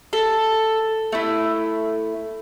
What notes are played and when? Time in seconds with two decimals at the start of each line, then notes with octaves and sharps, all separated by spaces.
0.13 A4
1.12 A3 E4